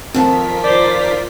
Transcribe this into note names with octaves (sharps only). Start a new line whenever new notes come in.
F2 D#3 C4 F4 A#4 A5 B6
C5 D5 D6